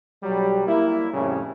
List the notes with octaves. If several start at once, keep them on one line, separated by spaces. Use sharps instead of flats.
B1 F#3 G3
A#3 E4
F2 A2 C#3 G3 C#4